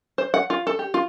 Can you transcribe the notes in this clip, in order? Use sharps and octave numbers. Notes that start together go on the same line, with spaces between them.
C5
F#5
F4
A4
G4
F4